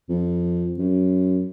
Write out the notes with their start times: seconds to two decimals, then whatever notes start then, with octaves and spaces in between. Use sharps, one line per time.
0.09 F2
0.78 F#2